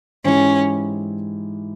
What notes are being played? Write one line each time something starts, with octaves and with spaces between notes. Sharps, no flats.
G#2 E3 G#3 C#4 E4 G4